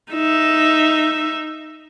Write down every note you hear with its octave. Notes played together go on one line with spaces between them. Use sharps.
D#4 E5